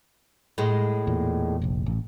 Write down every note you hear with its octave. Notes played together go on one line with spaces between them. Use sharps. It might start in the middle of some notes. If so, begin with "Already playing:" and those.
A2 G#3
E2 A#2
F1 A#1
A1